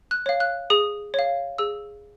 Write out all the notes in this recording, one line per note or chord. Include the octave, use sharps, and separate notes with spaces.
F#6
C#5 F5
F#6
G#4 D#6
C#5 F5
G#4 E6